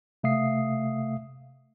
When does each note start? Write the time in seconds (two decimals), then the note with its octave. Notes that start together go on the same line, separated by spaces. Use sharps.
0.23 C3 A3 E5 F5 D#6 C7